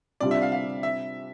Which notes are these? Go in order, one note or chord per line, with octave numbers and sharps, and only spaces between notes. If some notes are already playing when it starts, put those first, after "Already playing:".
C3 G3 D4 F4 D5
E5
F5
F5
E5